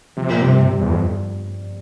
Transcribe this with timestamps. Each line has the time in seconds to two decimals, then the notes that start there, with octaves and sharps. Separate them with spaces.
0.17 C3 F3
0.30 A#2
0.42 G2 C3
0.70 G2
0.81 E2
0.91 F2